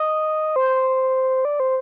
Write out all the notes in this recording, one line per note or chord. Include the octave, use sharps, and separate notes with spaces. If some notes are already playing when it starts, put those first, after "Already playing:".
Already playing: D#5
C5
D5
C5